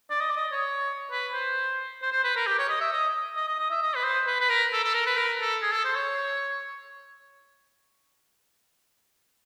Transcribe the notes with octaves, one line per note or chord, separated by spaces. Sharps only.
D5
D#5
D5
D#5
C#5
B4
C5
C5
C5
B4
A#4
G4
C#5
D#5
E5
D#5
D#5
D#5
D#5
E5
D#5
B4
C5
B4
B4
A#4
A4
A4
A#4
B4
A#4
A4
G#4
A4
C5
C#5